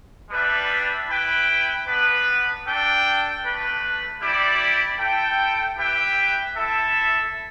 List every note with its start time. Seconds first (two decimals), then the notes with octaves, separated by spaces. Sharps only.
0.29 G3 D4 B4 E5
1.07 E4 B4 G5
1.85 B3 D4 B4
2.64 D4 A4 G5
3.42 A3 D4 B4
4.20 G3 E4 G4 D5
4.98 E4 A4 G5
5.76 E4 G4 B4 E5 G5
6.55 E4 A4 E5